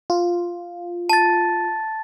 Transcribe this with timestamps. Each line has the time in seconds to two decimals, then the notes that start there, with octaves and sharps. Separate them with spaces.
0.10 F4
1.10 A5 A6